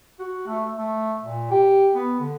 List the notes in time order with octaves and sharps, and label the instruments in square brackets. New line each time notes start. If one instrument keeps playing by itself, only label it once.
[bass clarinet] F#4
A3
A3
A#2
G4
B3
D3